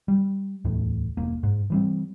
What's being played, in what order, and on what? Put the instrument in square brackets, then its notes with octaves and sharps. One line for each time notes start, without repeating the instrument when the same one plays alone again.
[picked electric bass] G3
D1 E2 A2
E1 A#3
G#2
E3 G3 C4